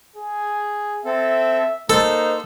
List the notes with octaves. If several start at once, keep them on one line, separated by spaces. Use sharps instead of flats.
G#4
C4 A4 E5
A#3 D#4 A4 C5